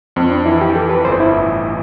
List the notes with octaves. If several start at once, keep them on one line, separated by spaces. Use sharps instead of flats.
F2 C4
D4
E3 E4
G4
E3 A4
B4
G1 C5
E4
A1